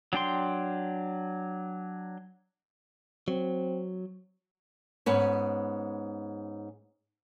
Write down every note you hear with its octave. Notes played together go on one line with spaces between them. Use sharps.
F#3 D4 G5 C6
F#3 C4
G#2 B3 C#4